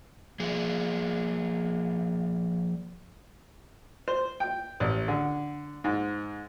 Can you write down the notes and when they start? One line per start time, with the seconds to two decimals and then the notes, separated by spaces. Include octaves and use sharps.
0.40 F3 A#3 G#4
4.08 C5
4.40 G5
4.80 A1
5.08 D3
5.84 G#2